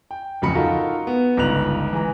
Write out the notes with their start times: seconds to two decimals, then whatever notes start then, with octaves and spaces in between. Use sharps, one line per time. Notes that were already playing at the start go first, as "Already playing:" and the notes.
0.11 G5
0.42 D1 F2 C#3 F#3 B5 C#7
0.55 D#4 F4 F#4 A4 A#4
1.07 B3
1.37 G1 C#2 D#4 F#6 F7
1.93 E3 G#3 A#5